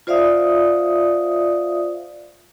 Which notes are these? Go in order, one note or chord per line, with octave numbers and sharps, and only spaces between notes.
F4 C5 D5 E5 F5 D#6